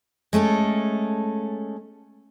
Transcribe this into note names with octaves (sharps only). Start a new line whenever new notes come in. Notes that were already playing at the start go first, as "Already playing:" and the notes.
G#3 A3 C#4 A4